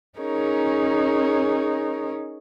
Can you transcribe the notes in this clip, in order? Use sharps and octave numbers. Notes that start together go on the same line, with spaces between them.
C#4 D#4 G#4 A#4 C#5